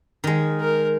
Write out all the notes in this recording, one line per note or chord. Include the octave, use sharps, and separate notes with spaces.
D#3 G#3
A#4